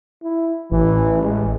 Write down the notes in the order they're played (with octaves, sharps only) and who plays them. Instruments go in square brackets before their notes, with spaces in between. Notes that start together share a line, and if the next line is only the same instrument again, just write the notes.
[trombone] E4
[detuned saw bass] A1 [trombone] E3
[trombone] G#3